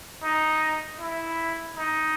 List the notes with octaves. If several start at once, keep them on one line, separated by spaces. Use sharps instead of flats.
D#4
E4
D#4